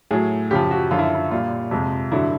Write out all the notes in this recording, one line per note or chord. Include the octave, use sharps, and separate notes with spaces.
A2 F#3 G#4
F#2 C#3 F3 G4
F#4
F#2 D3 F3 F4
E4
E4
A#2 G3 F4
F2 C3 F3 G#3
G2 D3 F#3 E4